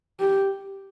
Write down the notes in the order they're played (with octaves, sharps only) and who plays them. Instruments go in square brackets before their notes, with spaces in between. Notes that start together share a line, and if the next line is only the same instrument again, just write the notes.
[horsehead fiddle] G4